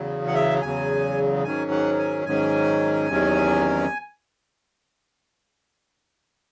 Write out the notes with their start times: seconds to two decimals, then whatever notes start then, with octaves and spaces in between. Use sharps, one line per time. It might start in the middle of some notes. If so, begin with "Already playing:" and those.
Already playing: E2 C#3 F#3
0.27 F#5
0.35 E5
0.62 E2 C#3 F#3 G#5
1.44 G#2 D#3 F#3 C#4 G#5
1.71 F#5
1.99 G#5
2.26 G#2 D#3 F#3 C#4 G#5
3.09 E2 C3 D#3 F#3 C#4